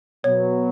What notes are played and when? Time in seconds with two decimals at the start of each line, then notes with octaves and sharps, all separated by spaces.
0.24 B2 F#3 B3 C#5